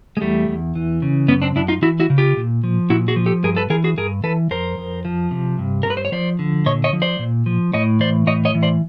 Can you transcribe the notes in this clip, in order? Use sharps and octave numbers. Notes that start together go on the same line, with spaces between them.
G#3
E2 G3 A3
E2
E3
C#3
F#2 B3 C#4
C4 D4
F#2 D4 E4
D#4 F4
E3 E4 F#4
E4 F#4
C#3
F4 G4
A#2
F3
A#2 E4 F#4
F#4 G#4
F3
G4 A4
G2 G#4 A#4
A4 B4
E3 G#4 A#4
F#4 G#4
G2 G#4 A#4
E3 A4 B4
F2 A#4 C5
F2
F3
C3
G2
G2 A#4
B4
C5
C#5
F3 C5 D5
D3
A#2 C#5 D#5
C#5 D#5
F3
C5 D5
A#2
F3
A2 C#5 D#5
E3 C5 D5
A2 C#5 D#5
C#5 D#5
E3
C5 D5